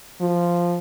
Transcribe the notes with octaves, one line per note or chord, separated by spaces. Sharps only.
F3